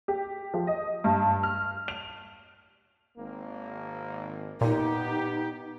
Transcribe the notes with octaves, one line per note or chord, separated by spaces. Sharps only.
G4
F3
D#5
G2
F6
F7
G#1 A#3
A#2 B3 D#4 G4